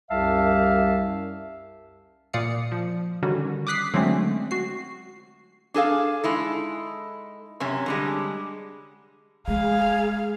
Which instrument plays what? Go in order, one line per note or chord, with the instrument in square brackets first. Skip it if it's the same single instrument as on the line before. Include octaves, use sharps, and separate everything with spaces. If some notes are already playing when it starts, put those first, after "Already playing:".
[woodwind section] C2 F#2 G4 E5 F5 A5
[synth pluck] A#2 D5 F5 D#6 C#7
F3
D3 D#3 G3 C#4 F#4
D6 D#6 F#6 B6 C7
D3 F#3 G#3 A3 C4 C#4
F#4 C7
[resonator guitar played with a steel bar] D4 G#4 A4 F5
G#3 D#4 E4 A4
F#2 C3 C#4
D3 G3 G#3
[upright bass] G#3 [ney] G#4 [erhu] F5